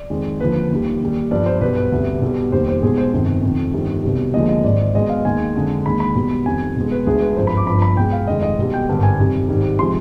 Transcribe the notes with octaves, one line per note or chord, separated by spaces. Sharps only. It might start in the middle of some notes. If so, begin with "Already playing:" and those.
Already playing: D5
F2 D#3 G#3
D#2 D3 F3 B4
D#2 D#3 G3
D#2 D#3 G3
G1 G2 F3 D5
C5
B1 B2 G3 B4
B4
D2 C3 G3
B1 B2 G3
F1 D#2 D#3 G3 C5
C5
B1 B2 G#3 G#4
C5
G1 F2 C3 D#3
F1 F2 D#3
G1 F2 D#3 G3
C2 B2 G3
D#2 D3 F3 G#3 D#5
D#5
G#1 G#2 D#3 D5
B1 B2 G#3 D#5
F5
D#2 D#3 G#3 G#5
F2 D3 G#3
D#2 D#3 G#3 B5
B5
B1 B2 G3
F2 D#3 G3 G#5
B1 B2 G#3
B4
D2 D3 G#3 G#4
B4
G#1 G2 F3 C5
B5
D6
G1 G2 F3 B5
B5
B1 B2 G#3 G5
F5
F1 F2 D#3 G#3 D#5
D#5
B1 B2 G3
G5
G#1 G2 D3
G#5
F2 C3 D#3 G3
G#1 G#2 D#3 G3
C3 F3 G#3 C6